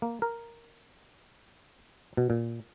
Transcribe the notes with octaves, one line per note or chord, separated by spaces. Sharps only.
A#3
A#4
B2
A#2